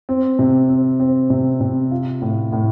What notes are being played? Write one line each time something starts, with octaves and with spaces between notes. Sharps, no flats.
C4
C3
C4
C4
C3
C3
F4
A2
A2